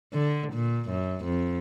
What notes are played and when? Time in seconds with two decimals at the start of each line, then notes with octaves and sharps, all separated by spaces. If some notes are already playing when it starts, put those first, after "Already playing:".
0.13 D3
0.53 A#2
0.90 F#2
1.25 F2